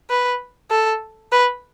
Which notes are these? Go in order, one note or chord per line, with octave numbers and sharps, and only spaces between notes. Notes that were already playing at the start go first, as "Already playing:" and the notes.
B4
A4
B4